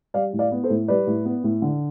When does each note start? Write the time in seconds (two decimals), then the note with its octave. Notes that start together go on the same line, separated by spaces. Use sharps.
0.14 G3 D5 F5
0.33 A2
0.39 D5 F5
0.52 B3
0.64 A4 C5
0.70 A2
0.88 G3 B4 D5
1.07 A2
1.25 B3
1.44 A2
1.62 D3